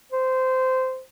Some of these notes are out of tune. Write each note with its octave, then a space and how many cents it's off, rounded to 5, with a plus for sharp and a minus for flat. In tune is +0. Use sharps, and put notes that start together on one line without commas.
C5 -15